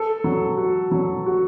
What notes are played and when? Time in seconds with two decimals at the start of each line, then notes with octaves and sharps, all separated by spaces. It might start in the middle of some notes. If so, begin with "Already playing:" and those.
Already playing: A4
0.24 F#3
0.58 F#4
0.92 F#3
1.26 F#4